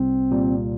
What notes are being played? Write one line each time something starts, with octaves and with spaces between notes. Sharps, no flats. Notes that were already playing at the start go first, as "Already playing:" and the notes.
Already playing: C2 C4
A#2 G3